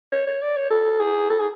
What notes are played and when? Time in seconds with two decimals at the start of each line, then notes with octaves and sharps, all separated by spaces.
0.12 C#5
0.27 C#5
0.42 D5
0.56 C#5
0.70 A4
1.00 G#4
1.30 A4
1.40 G#4